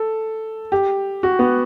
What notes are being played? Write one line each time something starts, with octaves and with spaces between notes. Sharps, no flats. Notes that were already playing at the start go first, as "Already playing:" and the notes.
Already playing: A4
G4
F#4
B3